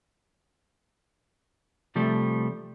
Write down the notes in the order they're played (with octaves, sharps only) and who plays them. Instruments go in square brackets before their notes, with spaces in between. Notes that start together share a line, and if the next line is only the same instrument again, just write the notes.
[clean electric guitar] C3 F3 G3 A3